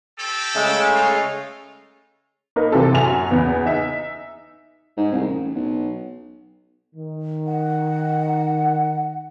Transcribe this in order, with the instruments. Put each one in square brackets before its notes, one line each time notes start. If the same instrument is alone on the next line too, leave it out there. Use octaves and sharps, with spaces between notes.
[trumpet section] C4 G4 A4
[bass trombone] C#3 [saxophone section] G#3 A3
[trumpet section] D#4 F4
[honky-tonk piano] A#3 D#4 A#4 B4
C3 E3 F#3 C4 A4
F#2 F#4 E5 G#5 F7
E2 C#3 B3
D#4 E5
[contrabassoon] G#2
C2
A1
B1
[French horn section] D#3
[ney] F#5